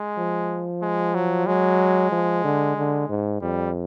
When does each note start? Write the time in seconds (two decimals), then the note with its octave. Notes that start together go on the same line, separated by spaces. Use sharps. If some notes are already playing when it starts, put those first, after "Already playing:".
Already playing: G#3
0.18 F3
0.82 G#3
1.15 F#3
1.47 F#3 G#3
2.11 F3
2.44 D3
2.77 D3
3.09 G#2
3.41 F2 G3